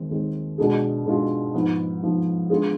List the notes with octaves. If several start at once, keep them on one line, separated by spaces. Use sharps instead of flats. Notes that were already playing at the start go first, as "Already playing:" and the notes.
Already playing: D#2 D#3 G#3 C4
D#2 D#3 G#3 C4
B2 G#3 D4 F4 G#4
B2 G#3 D4 F4 G#4
G#2 F3 B3
G#2 F3 B3
D3 G#3 B3 F4 G#4